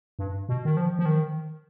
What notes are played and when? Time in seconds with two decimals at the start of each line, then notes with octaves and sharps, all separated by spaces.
0.19 G2
0.49 B2
0.65 D#3
0.77 F3
0.99 F3
1.06 D#3